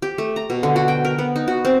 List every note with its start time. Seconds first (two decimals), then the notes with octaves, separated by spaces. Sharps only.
0.02 G4
0.18 A3
0.36 A#5
0.50 B2
0.63 D3
0.76 F#4
0.88 G5
1.05 A#4
1.19 B3
1.36 D#4
1.48 F#4
1.65 C4